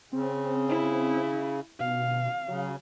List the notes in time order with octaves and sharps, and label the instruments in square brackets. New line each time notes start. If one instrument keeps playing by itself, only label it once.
[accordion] C#3 [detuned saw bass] C4
[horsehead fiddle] E4
[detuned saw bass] B2 [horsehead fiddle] F5
[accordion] C#3 [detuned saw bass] F#3